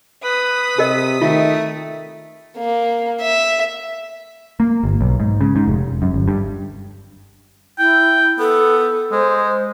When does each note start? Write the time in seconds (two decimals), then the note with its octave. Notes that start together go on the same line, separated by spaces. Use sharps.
0.24 B4 D#6 B6
0.78 C3 G4 A#4 D#5
1.21 D#3 A3 F4
2.57 A#3
3.21 E5
4.60 A#3
4.84 G1
5.01 B1
5.20 G#2
5.41 C#3
5.56 G#2
5.67 F1
6.02 F#2
6.14 G1
6.28 G2
7.79 E4 G5
8.39 B3 A4
9.12 G#3 C5